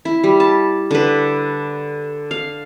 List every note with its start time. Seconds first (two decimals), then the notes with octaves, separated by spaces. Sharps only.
0.05 E4
0.24 G3
0.40 A5
0.91 D3 B4
2.31 F5